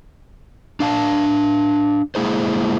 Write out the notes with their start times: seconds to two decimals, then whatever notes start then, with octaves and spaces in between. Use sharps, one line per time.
0.80 D4 F5 A5
2.15 G#3 A#3 E4 G#4 C5